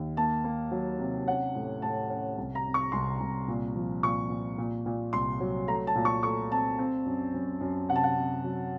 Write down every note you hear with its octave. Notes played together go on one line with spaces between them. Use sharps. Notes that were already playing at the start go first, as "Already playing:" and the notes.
Already playing: D#2
A#3 A5
A#3
F#3
C3
C#4 F#5
A2
A2 A5
C#4
C2
A#5
C3
C#6
C2 C6
C2
A#2
F3
A#2 C#6
A#2
A#2
A#2
C2 C6
F#3
A3 A#5
A5
A#2
C#6
A3 C#6
C4 A5
C4
F#2
F#2
F#2
C3 F#5
A5
F#5
C3
F#3